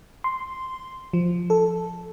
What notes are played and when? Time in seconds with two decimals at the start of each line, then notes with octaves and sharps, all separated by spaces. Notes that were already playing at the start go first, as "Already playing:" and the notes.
0.24 C6
1.13 F3
1.50 A4